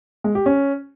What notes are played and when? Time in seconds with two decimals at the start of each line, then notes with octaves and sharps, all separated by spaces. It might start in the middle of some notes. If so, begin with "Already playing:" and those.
0.24 G#3
0.35 G4
0.46 C#4